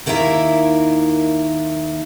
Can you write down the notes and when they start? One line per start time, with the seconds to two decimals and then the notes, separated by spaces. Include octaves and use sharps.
0.06 D#2 D#3 A#3 E4 E5 A#5